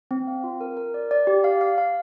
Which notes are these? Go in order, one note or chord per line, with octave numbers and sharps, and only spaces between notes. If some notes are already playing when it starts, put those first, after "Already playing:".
C4
F5
F4
A#4
A#4
D5
D5
G4
F5
F5
F5